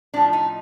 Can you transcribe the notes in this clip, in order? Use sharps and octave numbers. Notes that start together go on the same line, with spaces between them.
A2 F3 A3 D4
D#4